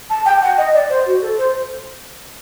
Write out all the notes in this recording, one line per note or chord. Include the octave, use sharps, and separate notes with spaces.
A5
G5
F#5
D#5
D5
C5
F#4
A4
C5